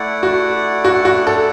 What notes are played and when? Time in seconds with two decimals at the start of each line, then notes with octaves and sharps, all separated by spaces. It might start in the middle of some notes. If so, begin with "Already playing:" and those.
Already playing: A3 E4 D5 F#5
0.23 F#4
0.84 F#4
1.05 F#4
1.27 A4